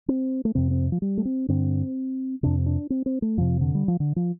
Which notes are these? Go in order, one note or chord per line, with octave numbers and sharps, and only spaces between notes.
C4
A3
F2 C3 C4
C4
F3
G3
A3
C4
G2 D3 C4
F2 C3 D4
D4
C4
C4
A3
F2 C3 F3
D3
G3
F3
D3
F3